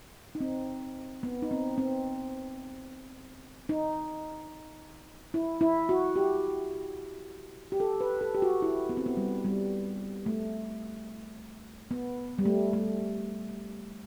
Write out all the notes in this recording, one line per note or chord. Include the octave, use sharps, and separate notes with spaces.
D#4
C4
B3
D#4
C4
C4
D#4
E4
E4
F#4
G4
G4
A4
B4
A4
G4
F#4
E4
B3
C4
B3
G3
G3
A3
B3
G3
A3
A3